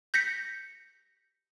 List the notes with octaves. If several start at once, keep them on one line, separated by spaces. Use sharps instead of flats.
G6 A#6 B6 C#7